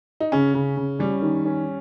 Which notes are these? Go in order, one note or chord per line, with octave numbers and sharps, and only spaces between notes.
D#4
C#3 C#4
C#3
C#3
G3 C#4
D#3
C#4